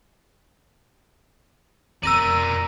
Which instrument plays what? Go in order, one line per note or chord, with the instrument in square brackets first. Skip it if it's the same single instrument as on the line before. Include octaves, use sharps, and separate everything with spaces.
[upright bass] F2 C3 [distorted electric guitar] A#4 D5 [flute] A#5 [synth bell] E6 A#6 D#7